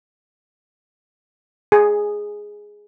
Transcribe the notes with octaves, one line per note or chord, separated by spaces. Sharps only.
G#4